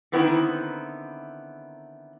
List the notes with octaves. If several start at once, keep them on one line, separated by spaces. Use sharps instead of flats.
D3 D#3 B3 C4 E4